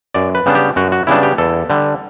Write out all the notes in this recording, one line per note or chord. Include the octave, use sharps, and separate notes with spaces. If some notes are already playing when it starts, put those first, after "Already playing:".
F#2 D5
B4
C#3 G3 B3 D4
G4
F#2 F#4
F#4
C#3 G3 B3 D4 E4
G4
E2 A4
D3 G3